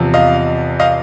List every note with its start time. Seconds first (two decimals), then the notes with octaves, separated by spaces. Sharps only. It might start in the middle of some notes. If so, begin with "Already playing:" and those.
Already playing: E2 C3 F3
0.14 D#5 F5
0.80 D#5 F5